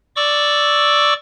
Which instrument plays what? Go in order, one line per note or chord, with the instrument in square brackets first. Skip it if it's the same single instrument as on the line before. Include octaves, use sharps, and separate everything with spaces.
[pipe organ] D5 C#6 D6 E6